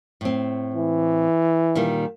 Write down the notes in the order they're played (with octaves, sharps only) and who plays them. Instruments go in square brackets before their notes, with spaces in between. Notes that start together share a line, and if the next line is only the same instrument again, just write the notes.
[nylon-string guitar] A2 C4
[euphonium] E3
[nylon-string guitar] A#2 D#3 G3